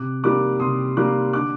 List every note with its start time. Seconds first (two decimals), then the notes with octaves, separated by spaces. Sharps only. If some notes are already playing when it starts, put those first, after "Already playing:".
Already playing: C3 D6 F#6
0.24 D#3 G3 A#3 D6 F#6
0.60 C3 C6 D#6
0.96 D#3 G3 A#3 D6 F#6
1.33 D3 D6 F#6